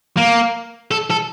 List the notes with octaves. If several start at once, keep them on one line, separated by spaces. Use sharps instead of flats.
A#3
A4
A4